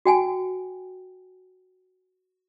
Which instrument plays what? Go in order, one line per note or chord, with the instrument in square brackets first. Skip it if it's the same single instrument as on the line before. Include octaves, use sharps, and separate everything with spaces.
[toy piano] F#4 G5 G#5